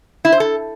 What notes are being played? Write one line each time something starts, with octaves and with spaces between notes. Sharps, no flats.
E4
C5
A4